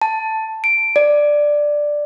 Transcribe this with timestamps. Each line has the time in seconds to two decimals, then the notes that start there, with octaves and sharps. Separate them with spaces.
0.02 A5
0.64 D7
0.96 D5